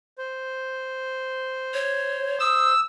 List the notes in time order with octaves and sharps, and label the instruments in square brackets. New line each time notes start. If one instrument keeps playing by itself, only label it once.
[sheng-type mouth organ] C5
[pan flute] C#5
[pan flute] D#6 [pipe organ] E6